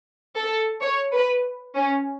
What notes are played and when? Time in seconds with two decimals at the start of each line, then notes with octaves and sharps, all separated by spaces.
0.37 A4
0.82 C#5
1.13 B4
1.75 C#4